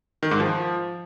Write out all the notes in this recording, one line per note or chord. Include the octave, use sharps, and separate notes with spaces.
D#3
G#2
F3